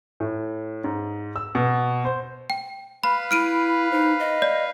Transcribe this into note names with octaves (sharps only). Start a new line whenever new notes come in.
A2
G#2
E6
B2
C5
G5
B4 F5 B5
E4 F6 D7 D#7
D#4 C5
D#5
D5